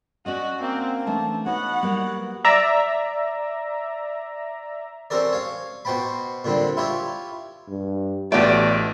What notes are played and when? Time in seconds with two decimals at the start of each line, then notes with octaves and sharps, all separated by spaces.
0.26 C#4 F#4 D5 D#5
0.61 A#3 C4
1.06 E3 A3 D4 A5
1.46 B3 D#4 F#4 C#5 F#5
1.83 F#3 G3 A#3
2.44 D5 E5 A#5
5.10 C4 C#4 G4 A4 A#4 D5
5.33 C#5 F5
5.85 B2 F#4 C5 G5 A5 B5
6.45 A#2 D3 G3 C4
6.77 E4 F4 G4 C#5 E5
7.68 G2
8.32 A1 A3 B3 F#4 G4 D5 D7